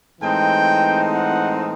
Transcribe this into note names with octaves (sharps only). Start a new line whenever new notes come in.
A2 E3 G#3 C4 D#4 G5
F#5